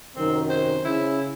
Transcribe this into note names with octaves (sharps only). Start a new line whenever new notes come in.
F#2 C3 D#3 C4
C5
C#3 E4